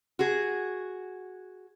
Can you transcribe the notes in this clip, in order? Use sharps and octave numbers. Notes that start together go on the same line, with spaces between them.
F#4 G#4